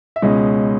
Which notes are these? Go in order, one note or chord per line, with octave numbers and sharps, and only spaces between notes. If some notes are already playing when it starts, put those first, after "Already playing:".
E5
C#2 B2 G#3 C#4 D#5